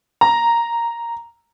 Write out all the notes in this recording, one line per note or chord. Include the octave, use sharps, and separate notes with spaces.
A#5